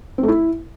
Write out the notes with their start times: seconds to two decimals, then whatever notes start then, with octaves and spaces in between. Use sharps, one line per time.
0.18 C4
0.23 A3
0.28 E4